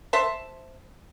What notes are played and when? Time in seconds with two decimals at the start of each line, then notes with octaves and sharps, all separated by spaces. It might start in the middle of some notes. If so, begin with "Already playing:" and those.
0.13 C5 E5 A5